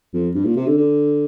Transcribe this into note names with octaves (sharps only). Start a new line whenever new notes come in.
F2
G2
A#2
C3
D3
D3